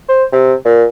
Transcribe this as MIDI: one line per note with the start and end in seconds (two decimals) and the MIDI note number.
0.09 0.24 72
0.32 0.53 48
0.65 0.84 46